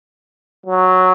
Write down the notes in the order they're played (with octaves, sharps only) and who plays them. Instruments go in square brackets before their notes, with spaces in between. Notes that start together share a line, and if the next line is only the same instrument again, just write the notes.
[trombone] F#3